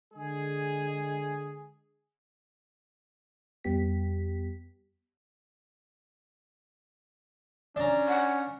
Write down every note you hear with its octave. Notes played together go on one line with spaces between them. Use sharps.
D3 G#3 G#4
F2 G3 B3 G4 B6
C#4 D4 A#5
F#5